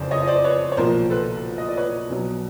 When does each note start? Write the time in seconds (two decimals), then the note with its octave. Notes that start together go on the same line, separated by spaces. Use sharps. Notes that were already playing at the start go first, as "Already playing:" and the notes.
Already playing: F#1 F2 C#3 C5 D5
0.11 C#5 D#5
0.22 D#5
0.27 C5 D5
0.44 B4 C#5
0.72 C#5
0.77 B1 A#2 F3 A#4 C5
1.10 A4 B4
1.58 D#5
1.68 D5
1.77 B4 C#5
2.10 B1 B2 F#3